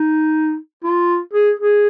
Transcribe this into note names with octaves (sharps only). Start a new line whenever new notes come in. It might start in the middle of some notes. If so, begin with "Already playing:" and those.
Already playing: D#4
F4
G#4
G#4